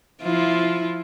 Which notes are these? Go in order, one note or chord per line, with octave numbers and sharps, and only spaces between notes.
F3 E4 F4